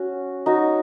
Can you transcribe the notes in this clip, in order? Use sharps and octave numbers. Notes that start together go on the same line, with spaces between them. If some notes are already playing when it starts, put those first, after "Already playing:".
Already playing: C#4 F#4
D#4 F#4 C#5